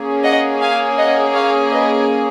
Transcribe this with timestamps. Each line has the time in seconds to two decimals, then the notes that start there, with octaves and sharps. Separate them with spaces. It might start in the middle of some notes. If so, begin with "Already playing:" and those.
Already playing: A#3 C#4 G#4
0.24 D#5 F#5
0.60 F5 G#5
0.99 D#5 F#5
1.35 C#5 F5
1.72 B4 D#5